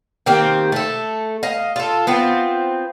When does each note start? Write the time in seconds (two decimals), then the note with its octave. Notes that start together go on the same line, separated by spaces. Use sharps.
0.26 D#3 A#3 C4 G4
0.72 A3 A4
1.43 D#5 F5
1.76 F4 A4
2.07 B3 C4 F4